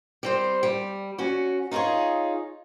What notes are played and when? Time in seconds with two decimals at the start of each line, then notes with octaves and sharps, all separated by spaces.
0.23 G3 C4 C5
0.63 G3
1.18 C#4 F#4
1.71 D#4 F4 F#4 G#4 C#5